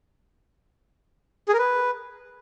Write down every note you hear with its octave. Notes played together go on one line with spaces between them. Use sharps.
G#4
A#4
B4